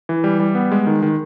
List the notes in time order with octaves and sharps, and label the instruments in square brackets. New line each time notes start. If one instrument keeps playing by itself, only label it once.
[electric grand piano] E3
G3
G3
B3
G#3
D#3
D#3